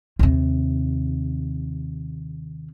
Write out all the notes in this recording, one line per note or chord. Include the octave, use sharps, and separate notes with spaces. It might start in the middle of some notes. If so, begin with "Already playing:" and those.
D#2 C3